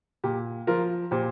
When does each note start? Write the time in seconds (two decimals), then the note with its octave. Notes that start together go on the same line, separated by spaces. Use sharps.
0.24 A#2 G4
0.67 F3 F4 A#4
1.11 A#2 G4 C5